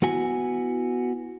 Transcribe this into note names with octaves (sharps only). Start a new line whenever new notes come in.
B3 E4 F#4 G#5